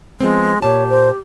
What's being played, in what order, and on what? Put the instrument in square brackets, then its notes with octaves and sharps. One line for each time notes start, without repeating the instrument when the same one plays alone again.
[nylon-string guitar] F3 B3 C4 [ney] G#3
[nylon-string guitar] A#2 A5 [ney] G4 [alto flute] C#5
[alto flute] C5